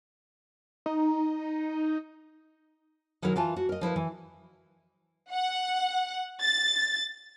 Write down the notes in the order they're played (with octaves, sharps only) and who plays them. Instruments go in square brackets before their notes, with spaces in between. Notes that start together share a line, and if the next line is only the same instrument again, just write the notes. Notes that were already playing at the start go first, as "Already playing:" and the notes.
[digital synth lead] D#4
[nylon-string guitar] D#3 F#3 E4 G#4 A#4
E3 F4 G#5 A5
F#4
A#4 D#5
F3 E4 A#4 B4
E3
[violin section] F#5
A6